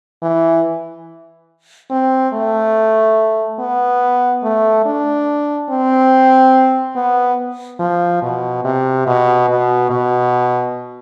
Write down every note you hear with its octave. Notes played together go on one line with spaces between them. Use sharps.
E3
C4
A3
B3
A3
D4
C4
B3
F3
B2
C3
B2
B2
B2